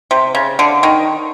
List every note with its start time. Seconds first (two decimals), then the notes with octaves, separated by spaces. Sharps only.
0.11 C3
0.35 C#3
0.59 D3
0.83 D#3